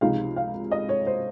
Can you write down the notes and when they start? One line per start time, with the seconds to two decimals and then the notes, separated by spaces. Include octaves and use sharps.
0.01 C#2 C3 F3 G#3 D#4 F5
0.36 F5
0.71 D#5
0.89 C#5
1.07 C5